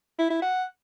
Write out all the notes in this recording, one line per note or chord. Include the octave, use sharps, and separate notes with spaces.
E4
E4
F#5